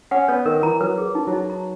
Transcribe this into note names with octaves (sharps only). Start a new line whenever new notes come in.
C#4 F#5
B3 C#5
D#3 A#4
E3 A#5
F#3 B4
G#4
D#4
F#3
D#4
A#5